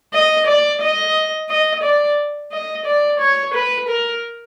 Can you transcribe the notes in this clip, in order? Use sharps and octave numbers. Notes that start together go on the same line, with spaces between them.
D#5
D5
D#5
D#5
D5
D#5
D5
C#5
B4
A#4